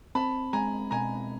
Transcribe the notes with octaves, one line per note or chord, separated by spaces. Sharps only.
C4 A5 B5
G#3 G#5 A#5
B2 G#5 A#5